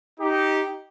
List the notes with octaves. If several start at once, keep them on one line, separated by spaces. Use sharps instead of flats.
D#4 G4